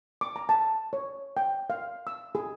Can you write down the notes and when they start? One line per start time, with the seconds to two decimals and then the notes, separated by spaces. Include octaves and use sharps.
0.21 D6
0.36 A#5
0.49 A5
0.93 C#5
1.37 G5
1.70 F5
2.07 E6
2.35 G#4